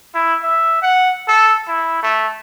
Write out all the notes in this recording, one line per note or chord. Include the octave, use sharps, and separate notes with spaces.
E4
E5
F#5
A4
E4
A3